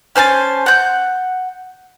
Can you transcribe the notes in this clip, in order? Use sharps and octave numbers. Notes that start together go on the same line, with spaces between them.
C#4 C5 G#5 A5
F#5 G6